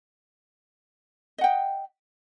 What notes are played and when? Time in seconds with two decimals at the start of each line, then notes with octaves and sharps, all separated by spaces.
1.38 D#5
1.41 F#5
1.44 G5